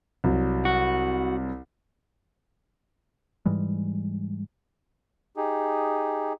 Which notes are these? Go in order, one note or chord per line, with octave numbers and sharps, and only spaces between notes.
C2 F#3
F#4
G#2 E3 G3 G#3
D#4 G4 G#4